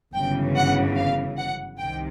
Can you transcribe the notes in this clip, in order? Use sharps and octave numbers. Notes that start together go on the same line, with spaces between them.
G1 F#2 C#3 E3 G5
F#5
F5
F#5
C2 C3 D#3 G5